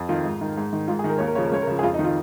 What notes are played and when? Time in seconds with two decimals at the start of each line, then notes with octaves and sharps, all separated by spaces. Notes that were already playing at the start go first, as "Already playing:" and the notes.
Already playing: F2
0.09 D#3 F4
0.25 G#2
0.41 D#3
0.57 G#2
0.73 D#3
0.88 G#2 F4
0.99 G#4
1.04 D#3
1.09 A#4
1.18 D#2 C#5
1.27 A#4
1.35 C#3 F3 C#5
1.45 A#4
1.51 C#2 C#5
1.62 A#4
1.67 C#3 F3
1.79 G#4
1.83 F2 F4
1.94 D#4
1.99 D#3
2.05 F4